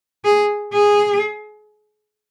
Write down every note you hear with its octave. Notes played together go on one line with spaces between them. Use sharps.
G#4
G#4